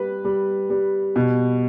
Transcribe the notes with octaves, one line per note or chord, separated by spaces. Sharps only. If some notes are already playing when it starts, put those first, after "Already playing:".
Already playing: G3 B4
G3
G3
B2